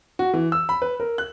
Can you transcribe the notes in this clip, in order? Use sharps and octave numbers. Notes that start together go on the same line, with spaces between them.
F#4
E3
E6
B5
B4
A#4
F#6